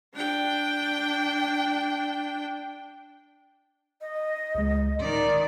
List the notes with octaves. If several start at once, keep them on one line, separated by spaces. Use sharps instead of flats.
D4 G5
D#5
C#2 G#3
A2 D#3 D5